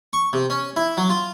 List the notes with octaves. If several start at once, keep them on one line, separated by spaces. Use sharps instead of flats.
C#6
C3
C#4
E4
F#3
F4